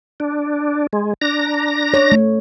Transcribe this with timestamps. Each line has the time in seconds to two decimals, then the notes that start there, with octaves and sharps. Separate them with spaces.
0.20 D4
0.93 G#3
1.22 D4 A#5 A#6
1.94 C#5
2.12 A3